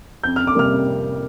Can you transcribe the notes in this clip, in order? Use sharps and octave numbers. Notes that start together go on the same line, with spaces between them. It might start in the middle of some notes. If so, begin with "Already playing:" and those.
F2 G6
F6
D6
C3 G3 A#3 F6
F2